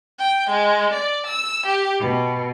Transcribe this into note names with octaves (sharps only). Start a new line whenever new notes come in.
G5
G#3
D5
E6
G4
B2